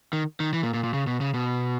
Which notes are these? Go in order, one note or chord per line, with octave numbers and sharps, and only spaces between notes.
D#3
D#3
E3
A#2
A#2
A#2
C#3
B2
C#3
B2